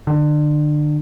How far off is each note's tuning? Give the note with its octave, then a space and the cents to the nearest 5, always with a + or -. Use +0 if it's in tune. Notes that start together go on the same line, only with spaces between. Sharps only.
D3 +30